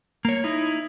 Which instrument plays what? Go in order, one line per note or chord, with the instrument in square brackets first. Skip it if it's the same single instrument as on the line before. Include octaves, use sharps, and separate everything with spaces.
[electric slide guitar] A#3 C#5
D#4 E4